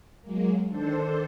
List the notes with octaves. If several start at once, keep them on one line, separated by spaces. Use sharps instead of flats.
F#3 G#3 A#3
D#3 D4 A4 C5